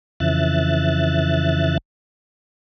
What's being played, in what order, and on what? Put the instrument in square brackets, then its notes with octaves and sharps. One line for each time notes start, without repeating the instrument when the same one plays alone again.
[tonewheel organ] F2 C#3 E3 E5 F#6 A6